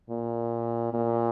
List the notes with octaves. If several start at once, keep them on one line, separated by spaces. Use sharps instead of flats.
A#2
A#2